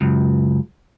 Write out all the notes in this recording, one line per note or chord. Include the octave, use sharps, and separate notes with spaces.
C#2 F#2